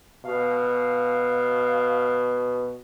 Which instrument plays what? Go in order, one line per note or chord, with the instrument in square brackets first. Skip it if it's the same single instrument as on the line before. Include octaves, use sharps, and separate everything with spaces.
[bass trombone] B2 [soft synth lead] F5